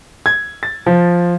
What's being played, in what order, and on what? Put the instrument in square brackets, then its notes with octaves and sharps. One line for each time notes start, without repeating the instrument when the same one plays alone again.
[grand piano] G#6
A6
F3